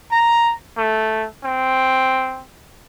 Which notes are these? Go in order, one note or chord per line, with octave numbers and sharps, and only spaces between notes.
A#5
A3
C4